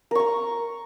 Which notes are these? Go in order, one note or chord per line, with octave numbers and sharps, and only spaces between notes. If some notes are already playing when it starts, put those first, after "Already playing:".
A#4 A#5 C#6